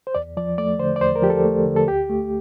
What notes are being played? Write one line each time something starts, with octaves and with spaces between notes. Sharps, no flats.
C5
E2 D5
F3 D5
A3 D5
D3 C5
D5
E2 C5
A#4
F3 G4
A4
A3
D3
A4
D2 G4
A3